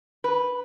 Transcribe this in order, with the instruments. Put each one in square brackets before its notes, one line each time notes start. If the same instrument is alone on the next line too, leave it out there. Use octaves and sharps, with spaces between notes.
[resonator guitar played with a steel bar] B4